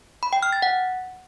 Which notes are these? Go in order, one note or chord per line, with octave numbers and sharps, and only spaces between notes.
B5
G5
F6
A6
F#5